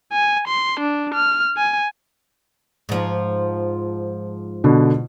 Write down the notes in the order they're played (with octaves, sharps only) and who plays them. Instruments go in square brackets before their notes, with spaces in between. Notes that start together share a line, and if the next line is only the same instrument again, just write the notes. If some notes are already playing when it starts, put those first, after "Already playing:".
[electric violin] G#5
C6
D4
F6
G#5
[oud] G#2 F3
[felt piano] B2 D3